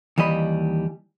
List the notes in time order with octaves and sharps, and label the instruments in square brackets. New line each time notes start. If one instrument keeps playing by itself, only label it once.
[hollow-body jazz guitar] D#2 E3 G3 D#5 B5